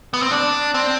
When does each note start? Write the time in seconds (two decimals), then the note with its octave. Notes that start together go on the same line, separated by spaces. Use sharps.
0.14 B3
0.22 C4
0.31 D4
0.74 C4